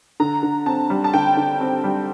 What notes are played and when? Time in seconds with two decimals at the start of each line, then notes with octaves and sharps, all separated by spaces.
0.20 D3 A#5
0.43 D3
0.66 C4 A5
0.90 G3
1.04 A5
1.14 D3 G5
1.37 D3
1.60 C4
1.84 G3